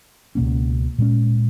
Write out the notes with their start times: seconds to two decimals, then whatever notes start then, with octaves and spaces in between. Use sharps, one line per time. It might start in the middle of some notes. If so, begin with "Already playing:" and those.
0.35 C#2 B2 A#3 C#4
0.98 A#2 G#3 C#4